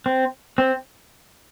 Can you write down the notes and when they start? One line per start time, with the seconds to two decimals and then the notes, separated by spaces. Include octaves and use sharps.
0.06 C4
0.58 C4